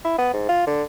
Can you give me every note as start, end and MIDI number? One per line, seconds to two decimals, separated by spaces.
0.05 0.18 64
0.19 0.29 59
0.34 0.48 44
0.49 0.67 65
0.67 0.83 50